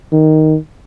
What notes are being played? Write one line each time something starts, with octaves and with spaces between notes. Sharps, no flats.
D#3